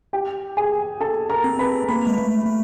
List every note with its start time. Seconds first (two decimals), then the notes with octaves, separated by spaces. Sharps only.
0.13 G4 G5
0.57 G#4 G#5
1.00 A4 A5
1.30 A#4 A#5
1.44 C4
1.59 B4 B5
1.88 A#3 B4 B5
2.07 G#3
2.18 A3
2.47 A3